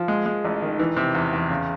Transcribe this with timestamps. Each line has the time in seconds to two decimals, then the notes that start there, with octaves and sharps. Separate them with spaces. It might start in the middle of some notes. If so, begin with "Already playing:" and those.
Already playing: F3
0.08 G#3
0.26 G#3
0.44 A1
0.62 D#3
0.79 E3
0.97 C3
1.15 E2
1.33 E2
1.50 C#3